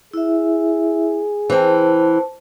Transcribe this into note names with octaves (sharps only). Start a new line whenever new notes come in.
E4 G#4 E5
E3 C4 C5 A5